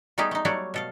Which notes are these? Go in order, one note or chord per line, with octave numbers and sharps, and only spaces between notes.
G3 A3 B3 D#4 G4 G#4
A3 D#4
F#3 G3 A3 F#4 C#5 D5
B2 A4 F5